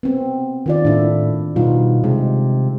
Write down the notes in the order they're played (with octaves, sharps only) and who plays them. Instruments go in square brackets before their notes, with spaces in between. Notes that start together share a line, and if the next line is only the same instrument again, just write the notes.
[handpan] B3 C4
D#3 F4 D5
[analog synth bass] A2 [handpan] D4 E4
[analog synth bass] B2 [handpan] G3 D#4 F4
[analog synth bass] C3 [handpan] G#3